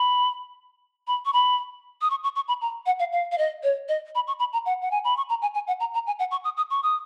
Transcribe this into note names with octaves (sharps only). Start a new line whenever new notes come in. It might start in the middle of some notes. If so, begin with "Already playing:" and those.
Already playing: B5
B5
C#6
B5
D#6
C#6
C#6
C#6
B5
A#5
F#5
F5
F5
F5
D#5
C#5
D#5
B5
C#6
B5
A#5
F#5
F#5
G#5
B5
C#6
A#5
G#5
G#5
F#5
A#5
A#5
G#5
F#5
C#6
D#6
D#6
C#6
D#6